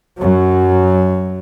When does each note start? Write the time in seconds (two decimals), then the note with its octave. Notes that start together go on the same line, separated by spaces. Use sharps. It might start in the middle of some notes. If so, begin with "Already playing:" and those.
0.19 F#2 F#3